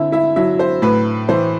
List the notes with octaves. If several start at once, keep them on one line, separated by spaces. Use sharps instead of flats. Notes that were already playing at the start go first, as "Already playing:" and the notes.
Already playing: D3 C4 E4 E5
E4 E5
F#3 E4 E5
C5
A2 B4
E3 C5